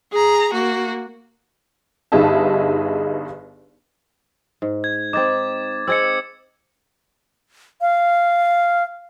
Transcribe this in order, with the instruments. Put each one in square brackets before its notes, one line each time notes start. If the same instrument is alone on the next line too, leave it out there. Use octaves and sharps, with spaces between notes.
[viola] G#4 A#5
A#3 F#4
[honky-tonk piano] G1 G2 D#4 G#4 E5 A5
[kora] G#2
[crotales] G#6
[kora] C4 D#4 [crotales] D6 G#6 A6
[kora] C4 G#4 D#5 [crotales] E6 G#6 C#7
[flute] F5